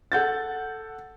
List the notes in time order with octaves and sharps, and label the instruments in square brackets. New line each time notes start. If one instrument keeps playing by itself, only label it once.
[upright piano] A4 F#5 G6 A6